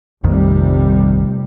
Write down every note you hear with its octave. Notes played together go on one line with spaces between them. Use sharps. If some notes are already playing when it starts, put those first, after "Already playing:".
F1 A#1 F2 C3 D#3 G3